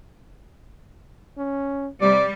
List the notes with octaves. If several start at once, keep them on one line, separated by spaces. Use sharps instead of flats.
C#4
C3 G3 D5